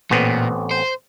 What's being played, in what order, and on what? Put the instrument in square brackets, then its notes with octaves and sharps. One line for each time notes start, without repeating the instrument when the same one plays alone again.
[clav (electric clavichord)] A1 B3 C4 [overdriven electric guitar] A#2
[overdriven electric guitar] C5